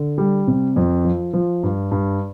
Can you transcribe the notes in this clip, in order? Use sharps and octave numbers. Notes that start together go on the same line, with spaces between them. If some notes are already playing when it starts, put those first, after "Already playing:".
Already playing: D3
G3
C3
F2
F3
F3
G2
G2